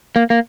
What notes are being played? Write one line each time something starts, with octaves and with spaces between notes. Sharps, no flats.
A#3
A#3